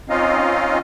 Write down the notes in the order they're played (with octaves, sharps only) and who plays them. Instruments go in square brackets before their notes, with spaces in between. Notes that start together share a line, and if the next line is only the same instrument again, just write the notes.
[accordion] C4 C#4 D#4 F4 D#5 F5